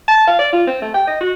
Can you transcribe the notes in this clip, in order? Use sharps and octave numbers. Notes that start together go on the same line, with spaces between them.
A5
F5
D5
F4
C4
A3
G5
D#5
F#4